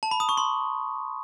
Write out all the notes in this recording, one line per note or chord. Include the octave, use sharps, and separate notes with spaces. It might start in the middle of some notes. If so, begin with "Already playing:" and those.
A5
B5
D#6
C#6
C6